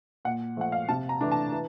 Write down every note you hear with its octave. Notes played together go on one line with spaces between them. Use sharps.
A#2 F#5
F3 A3 F#5
F5
C3 A5
A#5
E3 A3 D4
A5
E3